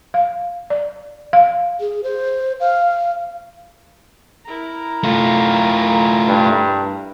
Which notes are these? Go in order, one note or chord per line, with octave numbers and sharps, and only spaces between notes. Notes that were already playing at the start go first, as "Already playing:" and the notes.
F5
D5
F5
G#4
C5
F5
E4 A#4 A#5
A3 F4
G2